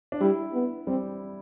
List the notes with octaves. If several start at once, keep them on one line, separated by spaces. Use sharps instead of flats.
D4
G3 E4
B3
G3 C4